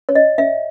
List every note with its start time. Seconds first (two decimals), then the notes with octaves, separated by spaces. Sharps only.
0.09 C#5
0.15 D#5
0.38 E5